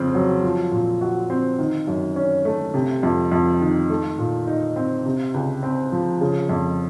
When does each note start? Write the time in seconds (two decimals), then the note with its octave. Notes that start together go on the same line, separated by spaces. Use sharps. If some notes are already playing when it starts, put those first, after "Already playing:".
Already playing: F2 C#3 C4
0.15 F#3
0.43 F3
0.72 A#2
1.01 F#4
1.30 C4
1.59 D#3
1.87 F#2
2.16 C#4
2.45 A3
2.74 C3
3.03 F2
3.32 F2
3.61 D#3
3.90 A3
4.18 A#2
4.47 D#4
4.76 C4
5.05 C3
5.34 C#2
5.63 C4
5.92 F3
6.21 C#3
6.49 F2